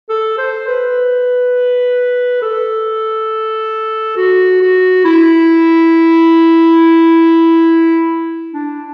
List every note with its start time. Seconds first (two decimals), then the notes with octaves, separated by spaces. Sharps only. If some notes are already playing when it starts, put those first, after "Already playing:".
0.10 A4
0.38 C5
0.68 B4
2.42 A4
4.17 F#4
4.61 F#4
5.05 E4
8.54 D4